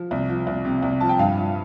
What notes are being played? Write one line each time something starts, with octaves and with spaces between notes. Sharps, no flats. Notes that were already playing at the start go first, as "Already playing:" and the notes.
Already playing: F3
C2
F3
C2
C3
C2
F3 A5
G5
G2 F5
F3